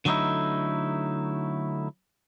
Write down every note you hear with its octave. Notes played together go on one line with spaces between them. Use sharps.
D3 F#3 A3 C4 D#4 E4